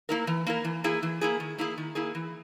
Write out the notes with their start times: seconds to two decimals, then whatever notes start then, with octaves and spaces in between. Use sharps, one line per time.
0.09 A#3 E4 A#4
0.27 E3
0.47 A#3 E4 A#4
0.65 E3
0.84 A#3 E4 G#4
1.03 E3
1.21 A#3 E4 G#4
1.40 D#3
1.58 A#3 E4 G#4
1.78 D#3
1.95 A#3 E4 G#4
2.15 E3